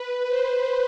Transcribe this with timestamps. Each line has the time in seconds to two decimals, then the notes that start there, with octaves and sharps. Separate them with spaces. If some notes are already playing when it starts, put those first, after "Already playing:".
Already playing: B4
0.29 C5